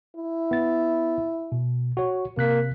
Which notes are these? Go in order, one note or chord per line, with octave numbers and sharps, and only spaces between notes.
E4
B3 A6
B2
F#4 C#5
C3 A#3 F#6 B6